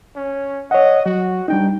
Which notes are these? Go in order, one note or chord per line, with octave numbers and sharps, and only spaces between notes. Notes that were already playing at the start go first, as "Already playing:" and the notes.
C#4
C#5 D#5 F#5
F#3 F#4
G3 D4 D#4 G5